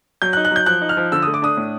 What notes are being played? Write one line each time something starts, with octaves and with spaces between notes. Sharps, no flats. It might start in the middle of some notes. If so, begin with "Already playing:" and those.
F#3 G6
F#6
D#4
F#6
F#3 G6
F3 F#6
D#4
F6
F3
D3 E6
A3 D#6
D6
D4 D#6
A2